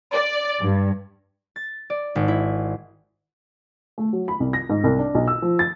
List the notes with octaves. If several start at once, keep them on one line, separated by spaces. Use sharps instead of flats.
D5
G2
A6
D5
G#1
E4
A3
F#3
B5
C2
A#6
G#2
C2
D4
B1
E6
F3
A6